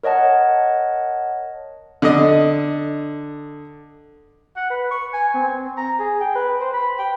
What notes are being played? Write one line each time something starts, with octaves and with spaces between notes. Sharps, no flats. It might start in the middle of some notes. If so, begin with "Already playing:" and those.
A#4 C#5 D#5 F#5 A5
D3 D#5
F#5
B4
C#6
G#5
C4
A#5
G#4
G5
B4
C5
B5
G5